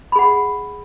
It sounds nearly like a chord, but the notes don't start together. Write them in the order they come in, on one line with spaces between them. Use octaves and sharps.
B5 G#4 F#5